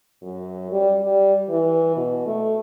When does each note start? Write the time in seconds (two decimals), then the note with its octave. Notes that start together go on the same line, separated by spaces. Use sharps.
0.23 F#2
0.72 G3
1.04 G3
1.49 E3
1.97 B2
2.26 A3